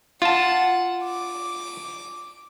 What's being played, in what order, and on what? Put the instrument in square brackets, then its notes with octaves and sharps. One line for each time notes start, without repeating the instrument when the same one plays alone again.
[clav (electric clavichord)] F4 A5 [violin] F#5
[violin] D6